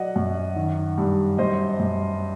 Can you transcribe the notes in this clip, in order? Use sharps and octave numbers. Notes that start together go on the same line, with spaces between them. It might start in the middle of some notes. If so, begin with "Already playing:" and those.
Already playing: F#3 D5 D#5 F#5
F#2
D#3
G2
F#2 C5 D#5
F#2